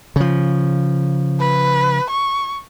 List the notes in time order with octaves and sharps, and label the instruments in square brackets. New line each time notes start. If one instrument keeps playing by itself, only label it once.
[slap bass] C#3 F3
[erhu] B4
C#6